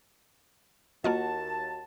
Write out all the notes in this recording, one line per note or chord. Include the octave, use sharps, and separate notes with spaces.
D#2 A#3 F4 F#4 D#5 A5